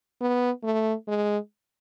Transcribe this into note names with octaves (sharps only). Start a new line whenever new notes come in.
B3
A3
G#3